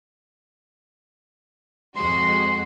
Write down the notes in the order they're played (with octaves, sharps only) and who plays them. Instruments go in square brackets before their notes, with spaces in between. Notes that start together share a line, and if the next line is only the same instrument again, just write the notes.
[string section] F2 G#3 F#4 [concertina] C6